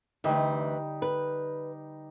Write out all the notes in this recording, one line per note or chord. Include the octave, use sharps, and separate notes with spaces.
D2 D3 E3 G3 D#4 D#5 G5
B4